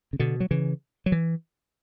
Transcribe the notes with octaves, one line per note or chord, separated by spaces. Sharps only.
C#3
B2 D3
F#3
C#3 E3
F#3
E3